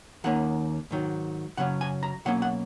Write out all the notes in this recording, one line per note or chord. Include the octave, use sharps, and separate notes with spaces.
D#2 D#3 A#3 C#4 F#5
G#2 D#3 F#3
F#2 C#3 F#3 C#4 F#5
G#5
A#5
B2 F#3 A#3 C#4 F#5
F#5